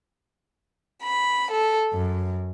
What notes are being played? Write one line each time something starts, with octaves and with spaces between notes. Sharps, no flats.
B5
A4
F#2